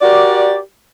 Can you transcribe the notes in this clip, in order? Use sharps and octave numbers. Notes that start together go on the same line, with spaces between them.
F#4 G4 A#4 D5